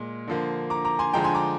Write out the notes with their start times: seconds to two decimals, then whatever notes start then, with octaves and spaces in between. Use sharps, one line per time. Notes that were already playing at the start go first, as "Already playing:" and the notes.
Already playing: A#2 G#3
0.27 D3 F3 A#3
0.70 A#5 D6
0.85 A#5 D6
0.99 G#5 C6
1.13 D3 F3 G#3 G5 A#5
1.24 G#5 C6
1.35 A#5 D6